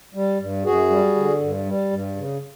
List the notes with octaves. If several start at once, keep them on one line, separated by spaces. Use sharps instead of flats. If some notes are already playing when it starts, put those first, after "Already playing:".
G3
G2
F#2 F#4 G#4
G3
D3
G2
G3
G2
C#3